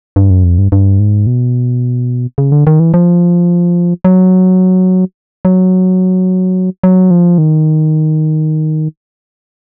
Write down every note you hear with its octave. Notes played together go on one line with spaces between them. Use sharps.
G2
F#2
F2
G2
G2
G#2
B2
C#3
D3
D#3
E3
F3
F#3
F#3
F#3
F3
D#3